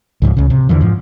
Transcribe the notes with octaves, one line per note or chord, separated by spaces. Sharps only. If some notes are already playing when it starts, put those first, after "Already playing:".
C#2 G#2 D#3 F3
C#2 C#3
C3
E2 D3 E3 F3
G#2 F3